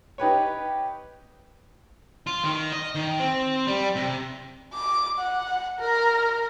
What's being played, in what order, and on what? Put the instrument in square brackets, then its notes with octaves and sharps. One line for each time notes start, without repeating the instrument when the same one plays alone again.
[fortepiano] D#4 G4 B4 C#5
[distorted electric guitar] F4
D#3
D#5
D#3
C4
G3
C3
[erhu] D6
F#5
A#4